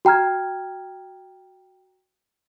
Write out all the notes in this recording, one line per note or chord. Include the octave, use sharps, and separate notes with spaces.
F#4 G5 A#5 F6 G#6